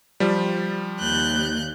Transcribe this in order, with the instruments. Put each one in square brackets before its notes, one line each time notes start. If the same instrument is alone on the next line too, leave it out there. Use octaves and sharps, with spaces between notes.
[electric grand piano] F3 G3
[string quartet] D#2 F#6 G6